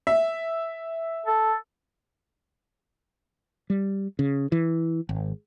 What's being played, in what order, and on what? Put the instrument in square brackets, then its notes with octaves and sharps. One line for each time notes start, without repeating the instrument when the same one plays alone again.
[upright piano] E5
[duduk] A4
[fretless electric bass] G3
C#3
E3
G#1